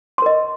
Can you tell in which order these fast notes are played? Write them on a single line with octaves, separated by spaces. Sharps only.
C6 A#4 D#5